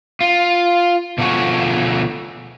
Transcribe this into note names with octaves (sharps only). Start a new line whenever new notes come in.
F4
B2 D3 F3 C#4 F#4 G#4